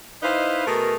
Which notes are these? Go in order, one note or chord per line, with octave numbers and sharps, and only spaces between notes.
D#4 E4 B4 C5 D#5 F5
B2 A3 G#4 A#4